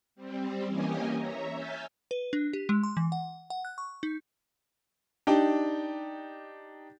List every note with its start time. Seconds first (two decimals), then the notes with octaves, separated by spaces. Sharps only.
0.16 G3 C4
0.67 E3 A#3 C#4 G4 D#5 G#5
1.14 C#5 E5 A#5
1.53 E5 G#5 F6 G6 A6 B6
2.11 B4
2.33 D4
2.53 G4
2.69 G#3
2.83 C6
2.97 E3
3.12 F#5
3.50 F#5
3.65 F#6
3.78 C#6
4.03 D#4
5.27 D4 D#4 G4